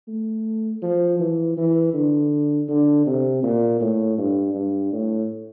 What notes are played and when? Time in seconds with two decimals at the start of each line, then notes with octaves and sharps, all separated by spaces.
0.08 A3
0.82 F3
1.20 E3
1.57 E3
1.94 D3
2.69 D3
3.06 C3
3.43 A#2
3.80 A2
4.18 G2
4.54 G2
4.92 A2